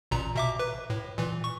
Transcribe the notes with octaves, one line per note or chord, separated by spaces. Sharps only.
A1 A#2 A#5
B2 E5 D6
B4
A2
A#2 E3
C#6